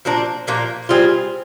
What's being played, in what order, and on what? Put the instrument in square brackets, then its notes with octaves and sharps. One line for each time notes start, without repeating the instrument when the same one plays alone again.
[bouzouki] A#2 F3 A#3 D4
A#2 F3 A#3 D4
G3 C4 F4 G#4